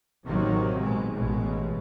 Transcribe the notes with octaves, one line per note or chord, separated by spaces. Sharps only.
A1 C3 D#3 F#3 A#3 C4
B2 G#3
A1 B2 G#3